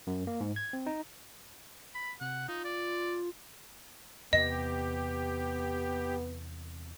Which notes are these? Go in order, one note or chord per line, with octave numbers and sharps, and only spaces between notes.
F#2
A#3
G#2
G#6
C4
D#4
B5
C3 F#5
D#4 F4
D5
E2 C3 B3 G4 D#5